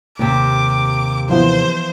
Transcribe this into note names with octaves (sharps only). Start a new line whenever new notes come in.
D#2 C3 D6
E3 F3 B3 C5